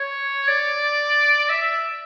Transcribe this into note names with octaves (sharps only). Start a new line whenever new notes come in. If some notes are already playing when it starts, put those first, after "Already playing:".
Already playing: C#5
D5
E5